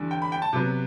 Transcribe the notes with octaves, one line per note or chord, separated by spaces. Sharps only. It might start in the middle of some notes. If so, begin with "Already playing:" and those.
Already playing: E2 D3 G3
G5
B5
G5
A5
C3 F#3 B3